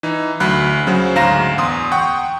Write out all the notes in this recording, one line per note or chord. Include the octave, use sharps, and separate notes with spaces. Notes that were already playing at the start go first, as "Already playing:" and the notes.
E3 D#4
D2 F#3 B5 F#6
C#3 F#3 C5
D2 G#2 F5 A#5 A#6 E7
E2 C6 D#6
F#5 G5 C#6